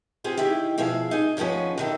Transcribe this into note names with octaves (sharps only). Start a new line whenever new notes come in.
B3 C4 F4 G#4
D#3 E4 G4
B2 F3 G#4 E5 F5
D#4 G#5
D#2 F3 G#3 B3 C#4
F#2 D#3 A4